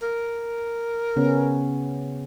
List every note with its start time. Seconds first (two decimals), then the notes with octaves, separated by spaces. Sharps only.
0.02 A#4
1.16 C#3 B3 C#4